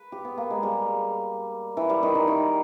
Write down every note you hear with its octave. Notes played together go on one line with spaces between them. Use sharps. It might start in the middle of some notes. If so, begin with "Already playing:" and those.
Already playing: B4
G4
B3
A#3
G#3
G3
E3
G3
D#3
D#3
D#3